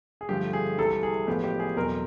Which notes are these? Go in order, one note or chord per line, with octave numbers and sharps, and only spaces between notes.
G#4
G2 D3 F3 A3 G4
G#4
C2 C3 E3 G#3 A4
G#4
A1 A2 F3 G#3 B3 G4
G4
G#4
E2 B2 F#3 A3 C4 A#4